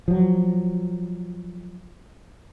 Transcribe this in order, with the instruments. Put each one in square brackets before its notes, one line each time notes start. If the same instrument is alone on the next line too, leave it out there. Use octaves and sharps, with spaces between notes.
[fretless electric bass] F3 F#3